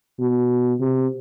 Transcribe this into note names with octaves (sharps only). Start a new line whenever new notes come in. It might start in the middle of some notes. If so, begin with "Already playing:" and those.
B2
C3